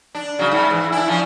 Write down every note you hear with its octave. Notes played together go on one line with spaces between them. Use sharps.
D4
C#3 F#3
G#2
E3
D4 E4
F3 C#4